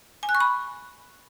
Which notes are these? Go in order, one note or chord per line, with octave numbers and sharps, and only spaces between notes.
G#5
F#6
C#6
B5